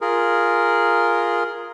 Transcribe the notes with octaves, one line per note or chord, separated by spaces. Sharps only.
F4 G#4 A#4